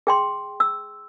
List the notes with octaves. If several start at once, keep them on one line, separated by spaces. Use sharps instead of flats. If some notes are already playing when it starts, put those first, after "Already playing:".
G#4 G5 C6
E6